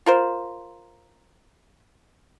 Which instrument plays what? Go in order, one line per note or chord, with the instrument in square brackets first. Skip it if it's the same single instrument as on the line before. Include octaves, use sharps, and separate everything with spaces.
[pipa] F4 A#4 C5